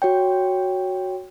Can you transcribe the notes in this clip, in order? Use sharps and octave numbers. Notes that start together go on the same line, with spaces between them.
F#4 C#5 G5